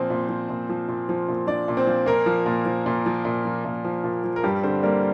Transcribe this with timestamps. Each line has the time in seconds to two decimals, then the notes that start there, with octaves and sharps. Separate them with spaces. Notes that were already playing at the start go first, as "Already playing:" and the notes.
Already playing: A#2 F3 C4 C5
0.10 A#2
0.29 F3
0.49 A#2
0.69 F3
0.88 A#2
1.09 F3
1.28 A#2
1.47 F3 D4 D5
1.68 A#2
1.77 C4 C5
1.87 F3
2.06 A#2 A#3 A#4
2.26 F3
2.46 A#2
2.66 F3
2.86 A#2
3.06 F3
3.25 A#2
3.45 F3
3.65 A#2
3.85 F3
4.04 A#2
4.24 F3
4.36 A#4
4.43 G2 G3 G4
4.63 D3 C4 C5
4.83 G3 A#3 A#4